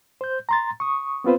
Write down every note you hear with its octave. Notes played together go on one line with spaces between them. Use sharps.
C5 G6
A#5 C6 A6
C#6 D#6
B3 C4 F4 B4 C5